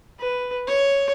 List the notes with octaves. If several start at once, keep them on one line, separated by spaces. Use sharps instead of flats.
B4
C#5